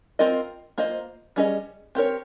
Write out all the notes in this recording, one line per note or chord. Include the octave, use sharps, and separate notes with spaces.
C4 F4 A#4 D#5
A#3 F4 C5 D#5
G3 C#4 G#4 C5 D#5
C4 G4 A#4 C#5